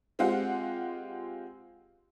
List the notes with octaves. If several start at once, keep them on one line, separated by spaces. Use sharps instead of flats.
G#3 C4 F4 G4 F5 F#5